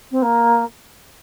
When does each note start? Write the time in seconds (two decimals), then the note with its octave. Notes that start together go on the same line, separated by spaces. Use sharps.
0.11 C4
0.22 A#3